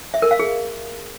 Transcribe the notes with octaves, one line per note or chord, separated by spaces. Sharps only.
E5
A#4
F5
G#4